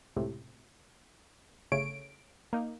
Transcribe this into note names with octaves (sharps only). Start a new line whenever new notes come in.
C#2 A2 C3
G1 C#3 A3 C#5 D7
A#3 D#4